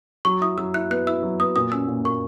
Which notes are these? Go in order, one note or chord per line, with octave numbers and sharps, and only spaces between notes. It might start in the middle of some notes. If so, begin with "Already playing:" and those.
F#3 C#6
E4 D#6
F#3 E6
E4 F#6
B3 F#6
E4 E6
F#3
B3 D#6
A#2 D#6
C#4 E6
A#2
A#3 C#6